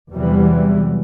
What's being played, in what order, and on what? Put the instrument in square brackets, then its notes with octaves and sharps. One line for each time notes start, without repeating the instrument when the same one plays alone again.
[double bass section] E2 C3 E3 F#3 G3